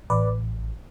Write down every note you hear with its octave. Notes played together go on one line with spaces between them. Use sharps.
A1 B4 D5